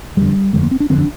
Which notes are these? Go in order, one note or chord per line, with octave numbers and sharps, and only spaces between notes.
G1 F2 D3 G3
G1 F2 D3 G#3
A#3
C4
D4
G1 F2 D3 C4
D4